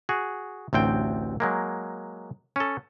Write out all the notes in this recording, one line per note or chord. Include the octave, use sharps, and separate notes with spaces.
F#4 G#4
A1 D2 C4 G5
F#3 G#3 A#3
C#4 A4